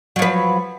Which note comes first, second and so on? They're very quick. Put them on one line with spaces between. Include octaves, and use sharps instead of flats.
F#3 F3 B4